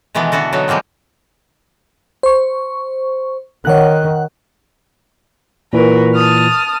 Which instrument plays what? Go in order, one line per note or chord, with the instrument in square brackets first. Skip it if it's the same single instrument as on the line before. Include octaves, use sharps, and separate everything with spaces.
[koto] B2 D#3 E3 G#3 A3 B3
D3 E3 B3 F#4 A4
D3 F#3 B3 D#4
F3 G3 G#3 A#3 C4
[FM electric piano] C5 C#6
[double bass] D#3 [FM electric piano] C#5 F#5 F#6
[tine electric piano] A#2 E3 [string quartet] F#4 A#4 B4
[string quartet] A5 D#6 F6